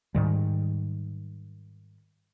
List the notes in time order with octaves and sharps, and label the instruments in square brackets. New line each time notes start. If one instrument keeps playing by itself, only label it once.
[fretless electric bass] G#2 D#3 G3